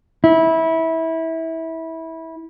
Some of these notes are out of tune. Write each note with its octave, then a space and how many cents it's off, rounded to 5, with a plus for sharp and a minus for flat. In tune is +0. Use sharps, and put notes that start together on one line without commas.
E4 -20